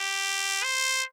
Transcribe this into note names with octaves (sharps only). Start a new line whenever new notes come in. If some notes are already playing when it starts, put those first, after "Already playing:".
Already playing: G4
C5